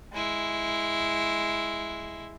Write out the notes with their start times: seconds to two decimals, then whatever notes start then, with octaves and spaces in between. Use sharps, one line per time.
0.13 G#3 E4